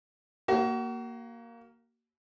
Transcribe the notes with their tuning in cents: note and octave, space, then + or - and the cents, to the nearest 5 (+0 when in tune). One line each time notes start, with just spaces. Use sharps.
A#3 +0 F#4 +35